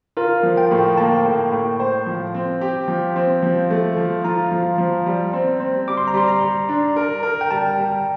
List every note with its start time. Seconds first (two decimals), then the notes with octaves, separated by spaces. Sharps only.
0.17 F4 A#4
0.43 F3
0.57 G5
0.71 A2
0.98 A#3 A5
1.26 A2
1.52 A2
1.80 C5
2.06 F3
2.34 C4
2.61 G4
2.88 F3
3.16 C4
3.43 F3
3.71 A3
3.97 F3
4.24 F4 A#5
4.51 F3
4.78 F3
5.06 G3
5.33 C4
5.60 C4
5.88 G3 D6
5.97 C6
6.08 A#5
6.14 G3 C6
6.28 A#5
6.42 G3
6.69 D4
6.96 A#4
7.23 A#4
7.41 G5
7.51 G3 A5
7.78 G3